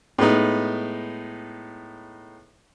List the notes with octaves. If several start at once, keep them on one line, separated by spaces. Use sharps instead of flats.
A2 G#3 B3 D#4